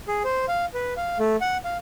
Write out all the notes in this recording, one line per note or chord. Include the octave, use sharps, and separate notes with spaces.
G#4
C5
F5
B4
F5
A3
F#5
F5